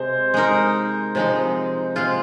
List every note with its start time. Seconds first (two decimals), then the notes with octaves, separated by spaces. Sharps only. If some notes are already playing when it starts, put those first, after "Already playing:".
Already playing: C3 G#3 C5
0.34 G#3 D#4 A#4
1.15 C3 F3 G#3 D#4
1.96 C3 G#3 F4